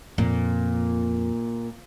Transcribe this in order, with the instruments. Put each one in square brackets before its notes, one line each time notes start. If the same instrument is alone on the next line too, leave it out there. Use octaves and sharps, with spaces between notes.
[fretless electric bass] F2 [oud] A#2